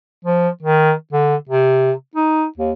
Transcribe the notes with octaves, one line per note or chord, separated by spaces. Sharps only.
F3
D#3
D3
C3
D#4
D#2